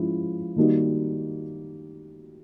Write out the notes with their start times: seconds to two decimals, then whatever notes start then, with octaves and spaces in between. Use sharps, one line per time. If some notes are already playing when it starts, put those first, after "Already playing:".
Already playing: F3 G#3 C#4 E4
0.56 D#3 G3 A#3 D#4 F#4